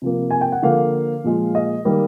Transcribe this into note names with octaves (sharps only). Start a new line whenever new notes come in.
C3 F3 A#3
G#5
G5
F#5
D3 F3 A#3 F5
A#2 F3 G#3
D#5
D#3 G3 A#3